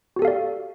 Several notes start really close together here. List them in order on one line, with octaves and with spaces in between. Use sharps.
F#4 G4 A4 F5 D5